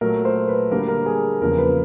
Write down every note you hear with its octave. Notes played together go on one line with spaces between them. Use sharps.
A#2 F#3 A3 A#4
C5
B4
D3 G3 A#3 D4 A#4
A#4
G#4
E2 C#3 F3 A#3 A#4
B4